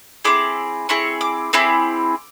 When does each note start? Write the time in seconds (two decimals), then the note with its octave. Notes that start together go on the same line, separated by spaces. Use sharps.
0.24 C4 E4 G#4 D6
0.89 C4 E4 G#4 C#6
1.21 D6
1.53 C4 E4 G#4 D6